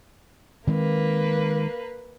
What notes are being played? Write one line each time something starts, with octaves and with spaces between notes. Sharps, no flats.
D#3 G#3 A#3 C4 B4